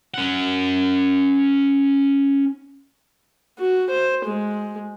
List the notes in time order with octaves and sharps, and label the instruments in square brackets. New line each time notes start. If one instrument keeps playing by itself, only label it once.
[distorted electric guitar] C#4 F#5
[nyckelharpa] F#4
C5
G#3